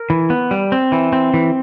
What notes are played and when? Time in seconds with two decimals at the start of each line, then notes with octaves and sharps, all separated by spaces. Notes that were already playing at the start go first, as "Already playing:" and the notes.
Already playing: A#4
0.10 E3
0.30 B3
0.51 G3
0.72 C4
0.92 E3
1.13 C4
1.34 E3